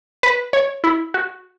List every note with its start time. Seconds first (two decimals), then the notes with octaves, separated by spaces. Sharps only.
0.23 B4
0.53 C#5
0.84 E4
1.14 F#4